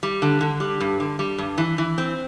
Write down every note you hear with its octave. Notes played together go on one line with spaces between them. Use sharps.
G3
D3
D3
G3
G2
D3
G3
G2
E3
E3
C4